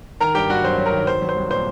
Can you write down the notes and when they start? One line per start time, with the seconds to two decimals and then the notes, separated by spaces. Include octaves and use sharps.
0.20 D#3 A#4 A#5
0.35 G2 G4 G5
0.50 G2 F#4 F#5
0.64 F#3 C5
0.78 F#3
0.86 A#4
0.93 D#3
1.07 F#3 C5
1.22 F#3
1.29 C5
1.36 C2
1.50 A#2 C5